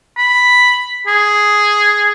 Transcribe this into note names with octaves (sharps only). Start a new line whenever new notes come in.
B5
G#4